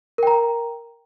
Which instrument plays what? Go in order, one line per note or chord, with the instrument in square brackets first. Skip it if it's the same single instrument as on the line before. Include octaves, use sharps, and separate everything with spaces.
[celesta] A#4
G5
A#5